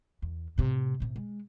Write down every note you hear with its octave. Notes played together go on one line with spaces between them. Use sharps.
E2
A2 C3
A2 C3
G#3